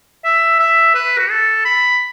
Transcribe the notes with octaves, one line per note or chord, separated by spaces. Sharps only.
E5
E5
B4
F#4
A4
B5